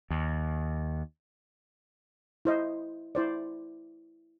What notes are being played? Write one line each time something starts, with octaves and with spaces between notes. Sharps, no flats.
D#2
E4 C5 D#5
E4 C5 D5